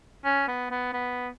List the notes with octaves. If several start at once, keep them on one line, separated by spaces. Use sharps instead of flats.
C#4
B3
B3
B3